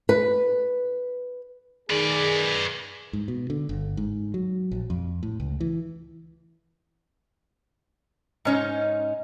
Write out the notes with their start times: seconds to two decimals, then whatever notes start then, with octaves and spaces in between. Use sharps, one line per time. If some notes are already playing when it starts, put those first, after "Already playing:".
0.09 B4
1.90 D#3 G#4 B4 D5
3.13 G#2
3.28 B2
3.50 D3
3.69 G1
3.97 G#2
4.34 F#3
4.72 A#1
4.90 F2
5.23 A2
5.40 C#2
5.60 E3
8.45 G#2 C#4 D#4